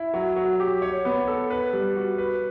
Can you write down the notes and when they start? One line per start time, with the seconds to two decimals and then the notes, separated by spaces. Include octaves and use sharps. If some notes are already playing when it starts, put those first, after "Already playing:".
Already playing: E4
0.14 F#3
0.36 F#3
0.60 G4
0.82 C#5
1.05 B3
1.28 A4
1.50 B4
1.73 G3
1.96 F#4
2.18 B4